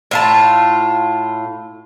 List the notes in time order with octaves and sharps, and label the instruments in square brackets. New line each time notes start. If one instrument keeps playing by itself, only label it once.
[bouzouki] A2 F4 A5